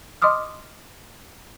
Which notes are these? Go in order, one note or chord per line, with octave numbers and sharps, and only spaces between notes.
D#5 C6 D6 D#6 F6